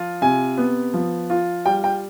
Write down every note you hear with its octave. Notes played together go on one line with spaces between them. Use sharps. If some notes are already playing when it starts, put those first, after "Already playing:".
Already playing: F3 F4
C3 G#5
B3
F3
F4
G3 G5
G5